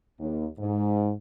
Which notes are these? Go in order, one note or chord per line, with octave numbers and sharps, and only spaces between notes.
D#2
G#2